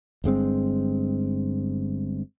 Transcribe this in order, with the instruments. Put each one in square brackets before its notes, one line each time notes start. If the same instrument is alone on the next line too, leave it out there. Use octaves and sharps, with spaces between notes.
[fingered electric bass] G1 G2 G#3 C4